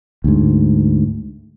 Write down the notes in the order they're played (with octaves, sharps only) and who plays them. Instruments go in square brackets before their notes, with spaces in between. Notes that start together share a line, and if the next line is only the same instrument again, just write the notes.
[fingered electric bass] D2 G#2